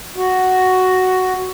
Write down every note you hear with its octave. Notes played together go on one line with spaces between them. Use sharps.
F#4